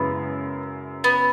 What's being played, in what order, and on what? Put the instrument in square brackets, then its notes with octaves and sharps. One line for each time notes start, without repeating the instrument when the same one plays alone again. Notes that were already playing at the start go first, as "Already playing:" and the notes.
Already playing: [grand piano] F#2 C#3 G#3 E4 [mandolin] B3
[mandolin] B3